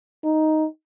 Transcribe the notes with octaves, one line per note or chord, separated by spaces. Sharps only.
D#4